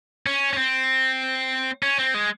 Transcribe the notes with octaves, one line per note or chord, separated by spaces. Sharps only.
C#4
C#4
C4
C#4
C4
G#3